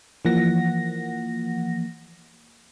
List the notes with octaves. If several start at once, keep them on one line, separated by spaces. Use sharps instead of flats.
E3 F3 A#3 F#5 A#6